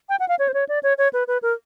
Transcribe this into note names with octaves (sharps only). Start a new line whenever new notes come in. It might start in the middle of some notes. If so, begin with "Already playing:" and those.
G5
F#5
F5
C#5
C5
C#5
D5
C#5
C#5
B4
B4
A#4